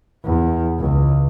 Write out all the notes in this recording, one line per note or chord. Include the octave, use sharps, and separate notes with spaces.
E2
C#2